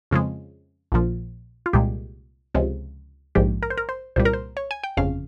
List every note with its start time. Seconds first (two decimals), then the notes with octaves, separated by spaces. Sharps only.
0.11 F2 C#3 F3 G#3
0.92 A#1 A#2 F3
1.66 F4
1.73 C2 A#2 G#3 G4
2.55 C#2 C3 F3 G#3
3.35 A#1 G#2 F3 G#3 G4
3.63 A#4
3.70 C5
3.78 A#4
3.89 C5
4.16 C2 A#2 G3 C5
4.25 A#4
4.33 C5
4.57 C#5
4.71 G#5
4.84 G5
4.97 G1 F2 C#3 F5